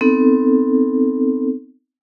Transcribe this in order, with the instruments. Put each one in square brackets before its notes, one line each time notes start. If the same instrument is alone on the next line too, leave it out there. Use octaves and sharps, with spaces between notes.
[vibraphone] B3 C4 D#4 A4